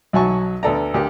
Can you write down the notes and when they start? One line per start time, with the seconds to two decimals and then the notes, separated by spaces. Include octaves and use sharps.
0.13 B1 F#3 F#4 G#5 A5 C#6
0.63 D2 B3 A4 D5 A#5
0.94 D2 G4 A#4